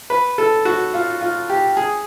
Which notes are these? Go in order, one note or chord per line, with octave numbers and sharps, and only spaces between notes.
B4
A4
F#4
F4
F4
G4
G#4